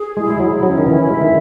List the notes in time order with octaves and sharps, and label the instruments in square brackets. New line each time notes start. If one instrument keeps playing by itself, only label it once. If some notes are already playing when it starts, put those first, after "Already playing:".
Already playing: [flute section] G#4
[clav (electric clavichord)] G#3 [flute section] E4
[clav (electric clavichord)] G#3
[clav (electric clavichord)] F#3 [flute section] E4
[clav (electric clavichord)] F#3 [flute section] C#4
[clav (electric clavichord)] D#3
[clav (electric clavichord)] E3 [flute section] E4
[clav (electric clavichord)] G#3 [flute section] E5
[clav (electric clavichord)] D#3